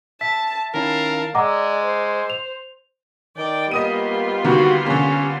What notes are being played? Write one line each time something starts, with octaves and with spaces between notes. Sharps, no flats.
E5 A5 B6
D#3 C#4 E4 A#4 F5 A5
G#3 D5 D#5 F#5 A#5 D6 E6
C5
F7
D#3 D5 G5
G3 A#3 B3 F4 D#5 D#6 D#7
D3 D#3 A#3 F#4
D3 A#3 C#4